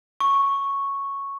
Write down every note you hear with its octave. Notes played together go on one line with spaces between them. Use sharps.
C#6